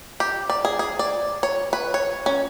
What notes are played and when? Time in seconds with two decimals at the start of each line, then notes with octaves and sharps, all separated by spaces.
0.20 G4
0.50 D5
0.65 G#4
0.79 G#4
0.99 D5
1.43 C#5
1.73 B4
1.94 C#5
2.26 C#4